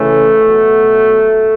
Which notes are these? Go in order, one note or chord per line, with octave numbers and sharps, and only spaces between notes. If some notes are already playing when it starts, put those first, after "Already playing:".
Already playing: C#3 E3 A3
B2 F#3